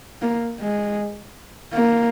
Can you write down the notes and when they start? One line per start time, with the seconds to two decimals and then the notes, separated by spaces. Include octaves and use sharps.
0.22 A#3
0.60 G#3
1.74 A#3